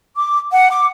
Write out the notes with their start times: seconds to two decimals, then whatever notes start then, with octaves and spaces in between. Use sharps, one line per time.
0.15 D6
0.51 F#5
0.70 D6